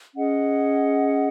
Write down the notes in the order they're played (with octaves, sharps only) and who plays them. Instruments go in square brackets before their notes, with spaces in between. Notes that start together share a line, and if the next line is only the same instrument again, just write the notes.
[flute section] C#4 G#4 D#5 F#5